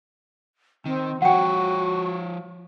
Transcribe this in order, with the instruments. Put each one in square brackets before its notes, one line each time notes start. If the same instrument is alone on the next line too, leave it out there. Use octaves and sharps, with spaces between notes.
[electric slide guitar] D#3 [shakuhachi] C4
[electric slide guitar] F3 C#5 [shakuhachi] F#4 [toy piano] F#5 G5